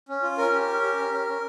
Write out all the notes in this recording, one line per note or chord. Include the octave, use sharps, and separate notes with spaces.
C#4
F4
C#4 A#4
G4
C#4
G4
C#4
C#4
C#4